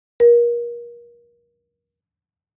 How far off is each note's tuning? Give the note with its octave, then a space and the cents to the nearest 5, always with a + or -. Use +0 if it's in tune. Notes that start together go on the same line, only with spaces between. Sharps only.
A#4 +30